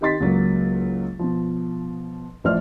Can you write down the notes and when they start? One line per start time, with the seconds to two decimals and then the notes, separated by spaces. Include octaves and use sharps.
0.01 D#3 G4 D#5 C6 A6 B6
0.20 C#2 F#3 A#3
1.19 B2 F3
2.44 A1 F3 C5 D5 E5 F6